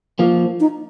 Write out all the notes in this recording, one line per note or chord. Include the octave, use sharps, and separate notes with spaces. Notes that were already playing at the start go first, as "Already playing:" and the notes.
F3 A#3
D#4